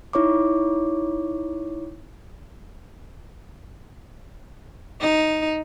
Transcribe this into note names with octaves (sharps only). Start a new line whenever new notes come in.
D#4 E4 C#5 C#6 D6
D#4